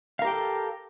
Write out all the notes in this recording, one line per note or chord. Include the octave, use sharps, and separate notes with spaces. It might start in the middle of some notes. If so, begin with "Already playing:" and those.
G4 A4 A#4 F5 G5